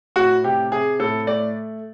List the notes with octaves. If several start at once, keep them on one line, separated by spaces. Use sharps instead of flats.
A2 F#4
C3 G4
C3 G#4
A2 A4
A3 D5